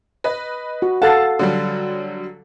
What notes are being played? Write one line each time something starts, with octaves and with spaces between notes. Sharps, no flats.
B4 D#5
F#4
A4 F5 F#5 A5 A6 C7
D3 F#3 G3